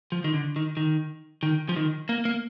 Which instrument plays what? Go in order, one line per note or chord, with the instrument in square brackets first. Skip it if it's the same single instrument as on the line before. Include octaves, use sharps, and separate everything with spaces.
[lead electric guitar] F3
D#3
D3
D#3
D#3
D#3
F3
D#3
A#3
A#3